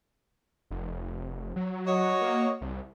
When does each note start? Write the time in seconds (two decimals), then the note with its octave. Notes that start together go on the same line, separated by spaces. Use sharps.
0.71 F1
1.56 F#3
1.86 F#4 C#5 D#5
2.21 A#3
2.61 C2